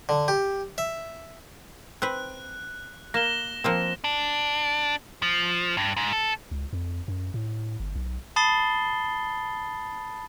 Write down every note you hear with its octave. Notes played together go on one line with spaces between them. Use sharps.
D3
G4
E5
C4 B4 F#6
A#3 A#6 E7 G7
F3 A#3 C4
D4
F3
G2
G#2
A4
C#2
F2
F#2
A2
G1
B1
A5 B5 D#6 A6 C7 G7